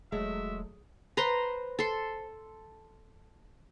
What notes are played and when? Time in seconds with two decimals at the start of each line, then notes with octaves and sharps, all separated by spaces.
0.12 E1 F#3 G#3 A3 E5
1.17 B4 C5 A#5 C6
1.79 A4 C6